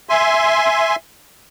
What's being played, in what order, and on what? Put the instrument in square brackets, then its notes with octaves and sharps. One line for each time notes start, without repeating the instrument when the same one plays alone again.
[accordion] E5 G#5 C6